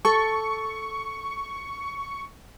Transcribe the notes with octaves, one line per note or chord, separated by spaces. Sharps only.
A4 C#6